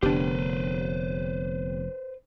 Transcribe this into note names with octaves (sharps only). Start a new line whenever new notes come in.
F1 D3 B3 D4 G4 B4 C5